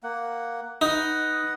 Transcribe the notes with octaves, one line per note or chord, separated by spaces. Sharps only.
A#3 F#5
D#4 B4 D#5 F#5